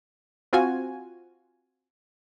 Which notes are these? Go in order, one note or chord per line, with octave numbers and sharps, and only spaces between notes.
C4 F4 F#4 G#5